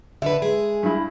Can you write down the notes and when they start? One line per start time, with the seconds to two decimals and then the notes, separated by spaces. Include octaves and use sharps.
0.22 D3 B4 E5
0.42 G#3 G#4
0.83 G2 E4